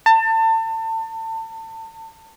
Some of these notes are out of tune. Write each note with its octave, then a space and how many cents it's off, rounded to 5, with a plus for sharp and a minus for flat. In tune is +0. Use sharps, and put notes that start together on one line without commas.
A5 +30